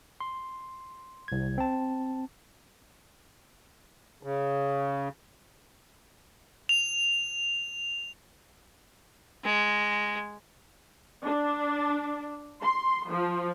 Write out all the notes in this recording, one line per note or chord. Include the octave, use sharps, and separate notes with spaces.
C6
C2 G#6
C4 A5
C#3
F7
G#3
D4
C6
F3